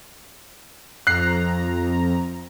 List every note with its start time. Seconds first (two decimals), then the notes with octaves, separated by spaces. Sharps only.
1.07 F2 A#5 F#6 C7